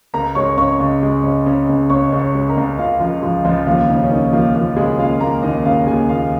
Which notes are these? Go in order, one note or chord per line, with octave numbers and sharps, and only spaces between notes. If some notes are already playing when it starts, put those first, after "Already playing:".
C#2 A#4 A#5
G#3 C#5 C#6
C#3 C#5 C#6
C#2
G#3
C#3
C#3
C#2
C#2 C#5 C#6
C#2
C#5 C#6
G#3
A#4 A#5
C#2
C#2 F4 F5
C#2 F3 F4
F3 G#3 F4
C#2 F3 F4
D#2 F3 F4
C#3 D#4
C#4
A#3 D#4
F3 A#3 F4
F3 A#3 F4
C#3 G#3 G#4
A#3 F4 F5
A#3 A#4 A#5
D#2 D#4 D#5
C#3 F4 F5
D#2 G#4 G#5
D#2 F4 F5